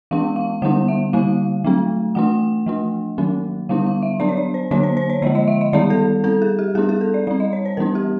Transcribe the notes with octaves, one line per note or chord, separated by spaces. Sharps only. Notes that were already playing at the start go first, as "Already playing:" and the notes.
E3 G#3 B3 D4 F5
F5
D3 G3 B3 D4 F#5
E5
D3 G3 A#3 F5
F#3 A3 C4
E3 A3 D4 F#5
F3 A3 D4
D#3 F#3 A#3 C#4
D3 G3 B3 D4 F5
F5
E5
F#3 B3 D4 D5
C#5
D5
C5
D3 F#3 A#3 D4 C#5
C5
C5
C#5
D3 F3 G#3 D5
D#5
E5
D#5
D#3 G3 B3 D5
A4
G3 C4 A4
G#4
G4
G3 B3 D4 G#4
G#4
A4
D5
G3 C4 D5
D#5
C#5
C5
E3 G3 B3 D4 A#4
G4